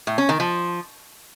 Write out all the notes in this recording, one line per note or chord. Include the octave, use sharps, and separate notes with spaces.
A2
C#4
D#3
F3